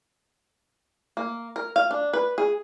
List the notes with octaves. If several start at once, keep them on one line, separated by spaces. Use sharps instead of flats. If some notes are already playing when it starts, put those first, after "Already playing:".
A#3
A#4
F5
D4
B4
G#4